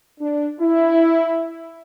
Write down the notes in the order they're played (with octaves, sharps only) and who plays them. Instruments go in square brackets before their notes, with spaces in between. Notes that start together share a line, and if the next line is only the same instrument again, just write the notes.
[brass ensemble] D4
E4